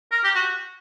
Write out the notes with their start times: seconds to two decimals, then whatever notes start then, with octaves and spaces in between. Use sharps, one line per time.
0.12 A#4
0.24 G4
0.35 F#4